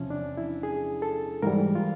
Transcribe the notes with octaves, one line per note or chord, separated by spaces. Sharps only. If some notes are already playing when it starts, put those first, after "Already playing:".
Already playing: E2 C3 F3 C#4
D4
E4
G#4
A4
G#2 E3 G3 A#4
F4